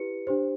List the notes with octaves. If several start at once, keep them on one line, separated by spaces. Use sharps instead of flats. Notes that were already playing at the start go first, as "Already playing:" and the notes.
Already playing: E4 G4 B4 C#7
D4 G4 C5